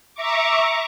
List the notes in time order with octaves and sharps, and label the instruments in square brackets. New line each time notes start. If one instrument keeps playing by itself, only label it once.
[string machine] E5 A#5 C#6 D6